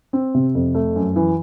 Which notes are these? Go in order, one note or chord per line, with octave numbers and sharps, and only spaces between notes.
C4
C3
F2
A3
F#2
E3